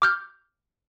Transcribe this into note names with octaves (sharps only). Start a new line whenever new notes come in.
D6 F6 G6